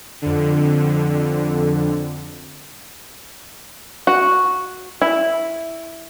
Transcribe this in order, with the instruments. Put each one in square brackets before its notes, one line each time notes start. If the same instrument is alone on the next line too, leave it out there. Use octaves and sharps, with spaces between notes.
[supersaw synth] F2 D3
[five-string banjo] F#4
E4